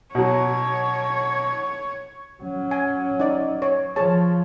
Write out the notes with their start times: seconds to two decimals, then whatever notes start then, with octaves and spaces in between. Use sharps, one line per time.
0.15 B2 F#3 C#5
2.42 F#3 C#4
2.71 G#5
3.20 D#4 D5
3.62 C#5
3.96 F3 G#4 C#5 A5